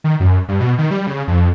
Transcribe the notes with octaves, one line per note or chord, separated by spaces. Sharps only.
D#3
F#2
G2
B2
D#3
G3
C#3
F2